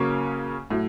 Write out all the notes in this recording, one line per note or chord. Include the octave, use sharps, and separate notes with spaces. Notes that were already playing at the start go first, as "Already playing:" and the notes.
Already playing: C#3 F#3 A#3 C#4
A2 F#3